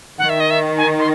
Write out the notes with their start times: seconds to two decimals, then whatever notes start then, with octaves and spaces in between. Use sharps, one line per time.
0.18 D#3 F#5
0.29 E5
0.40 D#5
0.51 E5
0.78 G#5
0.99 C6